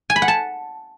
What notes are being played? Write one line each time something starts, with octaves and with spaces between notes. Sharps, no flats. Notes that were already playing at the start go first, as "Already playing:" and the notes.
G#5
B5
F#5
A5